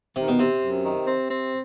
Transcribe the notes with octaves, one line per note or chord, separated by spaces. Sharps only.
C3 D#3
B2
C3 C4
F#2
D#3
C4
C4